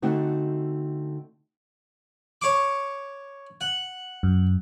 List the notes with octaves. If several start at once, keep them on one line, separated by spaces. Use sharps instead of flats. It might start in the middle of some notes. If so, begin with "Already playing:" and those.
D3 A3 C4 D#4 F#4
C#5 C#6 D6
F#5
F#2